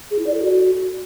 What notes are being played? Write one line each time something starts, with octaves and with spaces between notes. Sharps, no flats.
G#4
E4
D5
A4
F#4